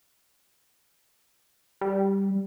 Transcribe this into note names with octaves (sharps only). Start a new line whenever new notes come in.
G3